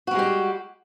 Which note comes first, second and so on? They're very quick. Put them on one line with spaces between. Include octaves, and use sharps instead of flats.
F#4 G3 G#3 G4